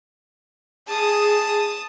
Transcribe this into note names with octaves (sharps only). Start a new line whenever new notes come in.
G#4 A5 D#6